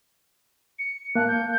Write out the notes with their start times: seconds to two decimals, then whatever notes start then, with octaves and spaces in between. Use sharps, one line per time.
0.79 C#7
1.15 A#3 F5 A5 F#6
1.28 G6